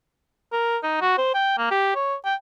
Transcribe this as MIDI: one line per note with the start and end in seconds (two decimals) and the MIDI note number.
0.52 0.78 70
0.83 0.99 63
1.01 1.16 66
1.18 1.34 72
1.34 1.57 79
1.58 1.70 58
1.71 1.92 67
1.96 2.15 73
2.25 2.35 79